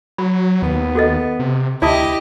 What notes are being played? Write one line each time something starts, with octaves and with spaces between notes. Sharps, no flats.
F#3 B5
D#2 B3
F#4 A4 D#5
C3
D2 E4 G4 D5 D#5 A5 D#6